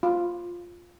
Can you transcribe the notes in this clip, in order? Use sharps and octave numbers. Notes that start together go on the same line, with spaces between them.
F4